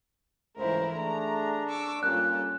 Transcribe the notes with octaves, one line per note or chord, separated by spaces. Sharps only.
C#2 G#2 E3 A3 E4 A#4 C5
A3 D4 G#4 A#5
C#6 D6 E6
G2 G3 A#3 C#4 F4 A4 F#6